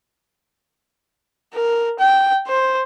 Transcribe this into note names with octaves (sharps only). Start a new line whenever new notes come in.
A#4
G5
C5